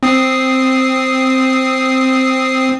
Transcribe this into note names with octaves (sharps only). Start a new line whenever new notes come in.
C4 D#6 C7